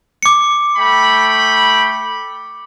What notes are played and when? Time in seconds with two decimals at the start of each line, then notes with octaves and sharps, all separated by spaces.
0.23 D6 C#7
0.76 A3 G5 B5